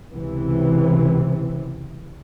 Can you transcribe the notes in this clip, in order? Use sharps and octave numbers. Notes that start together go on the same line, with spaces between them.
C#2 C3 E3